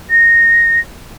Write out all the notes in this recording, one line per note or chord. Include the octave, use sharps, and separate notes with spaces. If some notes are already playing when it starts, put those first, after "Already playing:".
A#6